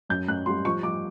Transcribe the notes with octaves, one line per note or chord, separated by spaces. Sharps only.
F#2 G6
F#2 F#6
G3 C6
F3 C#6
F3 D6